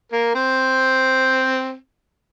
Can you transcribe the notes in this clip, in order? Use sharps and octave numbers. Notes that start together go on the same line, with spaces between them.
A#3 A#4
C4 C5